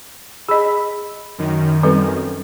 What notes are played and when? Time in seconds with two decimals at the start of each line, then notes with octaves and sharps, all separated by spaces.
0.49 G#4 D#5 B5
1.38 F#2 D#3
1.83 G3 C4 A4 B4